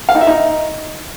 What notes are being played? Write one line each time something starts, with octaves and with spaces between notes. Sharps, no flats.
F5
D#4
E5
D#4